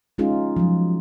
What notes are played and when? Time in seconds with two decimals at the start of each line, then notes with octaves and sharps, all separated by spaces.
0.18 G#3 C#4 D#4 F4 G#4
0.57 F3 F#3